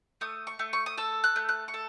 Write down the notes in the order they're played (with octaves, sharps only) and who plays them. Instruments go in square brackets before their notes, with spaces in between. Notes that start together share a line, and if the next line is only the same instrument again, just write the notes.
[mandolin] A3 D#6
C#6
A3
C#6
D#6
A4 E6
F#6
A3
F#6
C#6
A4